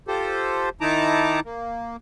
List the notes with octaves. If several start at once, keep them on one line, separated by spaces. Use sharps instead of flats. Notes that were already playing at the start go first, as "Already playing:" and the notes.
F4 G4 A4 C5
D#3 D#4 E4 A5 A#5 D6
A#3